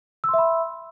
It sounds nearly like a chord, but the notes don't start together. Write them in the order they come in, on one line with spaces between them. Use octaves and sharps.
E6 C6 E5 B5